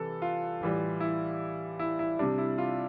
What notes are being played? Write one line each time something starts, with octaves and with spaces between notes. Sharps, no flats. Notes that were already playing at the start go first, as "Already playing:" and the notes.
Already playing: C3 E3 G3 A4 B4
F4
A2 E3 G3
E4
E4
E4
C3 G3 D4
E4
F4